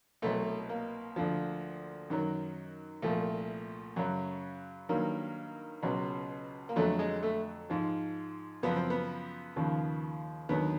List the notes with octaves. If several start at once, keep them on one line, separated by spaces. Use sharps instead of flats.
C2 B2 F#3 A3
A#3
D2 D3 F3
F#2 D#3 F#3
C2 A#2 F3 A3
F#2 C#3 F#3
G2 D#3 F#3 A#3
C#2 B2 F#3
A#3
F2 D3 F#3 A3
G#3
A3
G#2 F3
F#2 C#3 F3 B3
C4
B3
D#2 C#3 F3
D#2 D3 F#3 B3